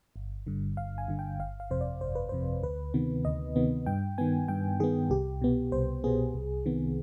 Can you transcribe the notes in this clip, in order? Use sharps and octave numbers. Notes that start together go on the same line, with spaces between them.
G1
G2 D3
G1 F5
G#5
G2 D3
G5
G1 F5
F5
F2 C3 C5
D5
G1 C5
B4
F2 C3 C5
D2 B4
C3 D#3 B3
D2 D#5
C3 D#3 B3
G2 G5
D#3 B3 G#5
G2 G5
D#3 B3 G#4
C2 G4
B2 B3
C2 C5
B2 B3 G#4
C2
C3 D#3 B3